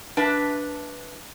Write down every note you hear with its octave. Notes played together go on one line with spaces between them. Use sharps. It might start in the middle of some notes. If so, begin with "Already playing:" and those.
D4 B4 E5 A5